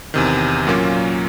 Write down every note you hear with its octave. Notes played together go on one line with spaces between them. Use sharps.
E2 C3 D#3
A#2 F#3 A#3 C#4 F4